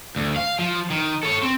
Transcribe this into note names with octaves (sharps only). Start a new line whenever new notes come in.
D2
F5
F3
D#3
A4 C#5
C4